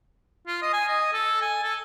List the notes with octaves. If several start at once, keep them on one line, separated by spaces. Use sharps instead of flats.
F4
D#5
G#5
D#5
A4
G#5
A4